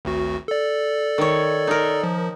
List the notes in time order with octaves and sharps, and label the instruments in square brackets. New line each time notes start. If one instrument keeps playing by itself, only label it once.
[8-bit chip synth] G#1 D2 F#4
A4 D5
[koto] D#3 C#5
D#4 A#4
[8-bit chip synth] F3